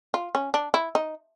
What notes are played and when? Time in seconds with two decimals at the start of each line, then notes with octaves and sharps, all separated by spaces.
0.14 F4
0.35 C#4
0.54 D4
0.74 E4
0.95 D#4